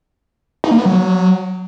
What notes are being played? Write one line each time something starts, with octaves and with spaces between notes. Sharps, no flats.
D#4
A#3
B3
F#3